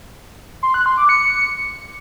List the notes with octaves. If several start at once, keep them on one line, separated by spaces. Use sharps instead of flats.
C6
F#6
C6
D6
C#7